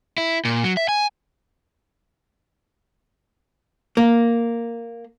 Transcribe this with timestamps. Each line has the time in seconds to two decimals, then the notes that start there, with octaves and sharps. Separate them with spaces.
0.18 E4
0.45 A#2
0.64 F#3
0.77 E5
0.89 G#5
3.97 A#3